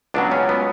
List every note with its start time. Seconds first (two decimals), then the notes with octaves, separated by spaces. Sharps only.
0.14 C#2 B2 F#3 D4
0.32 C#4
0.49 B3